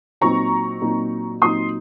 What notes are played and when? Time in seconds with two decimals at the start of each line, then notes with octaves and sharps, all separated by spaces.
0.21 A#2 F#3 C4 D#4 A#5 C#6
0.82 A#2 F#3 C4 D#4
1.42 A#2 F#3 C4 D#4 C6 D#6